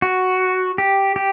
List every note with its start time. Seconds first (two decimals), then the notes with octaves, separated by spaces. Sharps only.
0.02 F#4
0.78 G4
1.16 G4